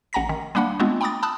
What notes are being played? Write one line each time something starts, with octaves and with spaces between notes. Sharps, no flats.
A1 F#5 G#5 A#5 A#6 B6
D#3
G3 A#3 D4 F#5 B5
G#3 A3 B3 C4 D4 F4
G5 A#5 B5 D6 D#6 A6
A5 B5 D#6 E6 F#6